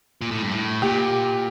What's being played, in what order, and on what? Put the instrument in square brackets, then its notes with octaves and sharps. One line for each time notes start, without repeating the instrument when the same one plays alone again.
[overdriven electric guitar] A#2
A2
G2
A2
[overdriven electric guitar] A#2 [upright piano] G4